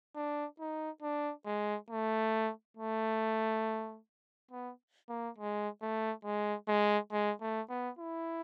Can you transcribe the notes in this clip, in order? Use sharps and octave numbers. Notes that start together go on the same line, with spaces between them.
D4
D#4
D4
G#3
A3
A3
B3
A#3
G#3
A3
G#3
G#3
G#3
A3
B3
E4